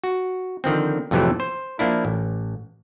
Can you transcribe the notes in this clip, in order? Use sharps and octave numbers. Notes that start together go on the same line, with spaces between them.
F#4
D3 D#3 F3 C4
F2 A2 C3 E3 F#3 A3
C5
F3 A#3 D4 E4
A1